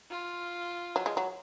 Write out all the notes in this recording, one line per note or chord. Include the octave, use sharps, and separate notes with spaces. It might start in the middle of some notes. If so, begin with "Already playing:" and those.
F4
F#3
G#3
F#3